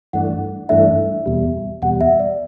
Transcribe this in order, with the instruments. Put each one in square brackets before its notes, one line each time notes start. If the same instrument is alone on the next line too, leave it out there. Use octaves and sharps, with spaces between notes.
[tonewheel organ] G2 E3 A3 D4 [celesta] F#5
[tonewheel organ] G2 E3 A3 D4 [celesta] E5
[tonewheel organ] E2 B2 G3
[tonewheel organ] E2 B2 G3 [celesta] F#5
[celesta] E5
D5